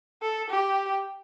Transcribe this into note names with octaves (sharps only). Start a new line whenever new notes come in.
A4
G4